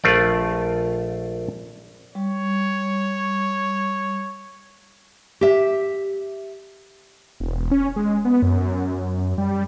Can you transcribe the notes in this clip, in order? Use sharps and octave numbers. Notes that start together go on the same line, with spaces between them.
A#1 A3 F4 D5
G3 C#5
G4 E5
E1
C#4
G#3
B3
F#2
G3